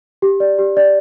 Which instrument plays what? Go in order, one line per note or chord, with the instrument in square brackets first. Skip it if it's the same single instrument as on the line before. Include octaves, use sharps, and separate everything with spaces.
[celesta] G4
D5
G4
D5